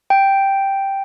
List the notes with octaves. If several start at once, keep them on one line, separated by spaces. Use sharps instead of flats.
G5